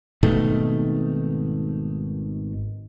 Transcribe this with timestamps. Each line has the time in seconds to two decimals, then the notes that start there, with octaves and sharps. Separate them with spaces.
0.23 G#1 B2 D#3 A3